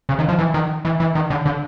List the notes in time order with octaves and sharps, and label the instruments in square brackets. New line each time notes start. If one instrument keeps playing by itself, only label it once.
[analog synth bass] C#3
D#3
F3
E3
D#3
E3
E3
D#3
D3
D3